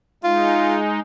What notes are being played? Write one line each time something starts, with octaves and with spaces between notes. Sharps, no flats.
G#3 D#4 F4